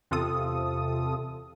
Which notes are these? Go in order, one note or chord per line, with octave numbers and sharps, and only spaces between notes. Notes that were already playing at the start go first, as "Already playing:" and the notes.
E2 C3 F4 A4 D#6